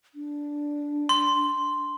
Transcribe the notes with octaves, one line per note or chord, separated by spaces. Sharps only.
D4
C6